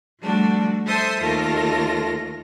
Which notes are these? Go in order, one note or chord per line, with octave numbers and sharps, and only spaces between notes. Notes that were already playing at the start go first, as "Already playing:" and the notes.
F3 G3 A3 D4 F#4
A4 C5 E5 C6 D#6 G6
D#2 A3 F4 A4 A#4 A#6